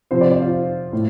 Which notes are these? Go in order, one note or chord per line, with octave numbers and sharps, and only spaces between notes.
C3 F3 C5
D5
D5
F4
A2